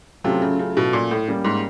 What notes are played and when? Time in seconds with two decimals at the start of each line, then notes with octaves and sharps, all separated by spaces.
0.24 C3 F#3 A3 C#4 F4
0.42 C#3
0.59 C#3
0.77 B2
0.93 A#2
1.11 A2
1.28 G3 A#3 C#4
1.45 G#2